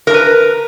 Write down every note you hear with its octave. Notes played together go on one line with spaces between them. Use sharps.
A#4 B4 A#5